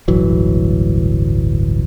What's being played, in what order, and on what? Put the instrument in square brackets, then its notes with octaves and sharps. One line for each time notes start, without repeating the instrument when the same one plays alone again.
[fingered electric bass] D1 G1 E3 F#3